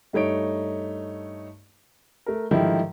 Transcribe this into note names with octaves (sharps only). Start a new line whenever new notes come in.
G2 A3 D#4 C#5 D7
A3 A#4
G#2 D3 D#3 F3 G3 E4